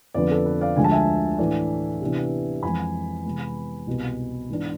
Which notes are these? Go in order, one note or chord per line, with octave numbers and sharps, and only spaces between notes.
F2 D3 F3 B3 D4 B4 D5
A4
B4
D5 F5
D2 D3 F3 G#3 G#5
A5
E5 G#5
A2 E3 A3 D4
C3 E3 B3 D4
F2 E3 G#3 G#5 B5
C3 E3 G#3 B3
C2 B2 B3
G#2 E3 B3 D4